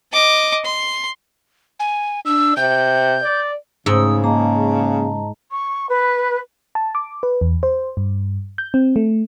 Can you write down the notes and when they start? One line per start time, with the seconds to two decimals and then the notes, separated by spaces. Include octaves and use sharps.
0.13 D#5 D6
0.65 C6
1.80 G#5
2.25 D4 E6
2.57 C3 G6
3.22 D5
3.86 G#2 C#3 A3 D#4 D#6 E6
4.24 A#3 D#5 A5 A#5
5.51 C#6
5.89 B4
6.75 A5
6.95 D6
7.23 B4
7.41 E2
7.63 C5
7.97 G2
8.58 G6
8.74 C4
8.96 A3